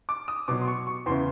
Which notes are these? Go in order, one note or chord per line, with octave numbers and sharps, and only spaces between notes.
D6
D#6
B2 F#3 D6
C6
C#6
C#6
E2 C#3 E3 C6